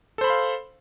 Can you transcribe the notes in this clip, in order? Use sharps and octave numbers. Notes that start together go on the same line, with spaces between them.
A4 C5 F5 B5 C6